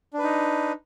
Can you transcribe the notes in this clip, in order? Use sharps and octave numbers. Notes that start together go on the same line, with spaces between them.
D4 D#4 B4